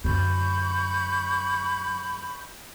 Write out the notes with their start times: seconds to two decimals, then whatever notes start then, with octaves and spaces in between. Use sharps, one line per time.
0.04 F#2 D3 B5 C#6 G6